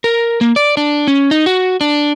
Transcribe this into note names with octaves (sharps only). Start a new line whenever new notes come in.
A#4
A#3
D5
D4
C#4
D#4
F#4
D4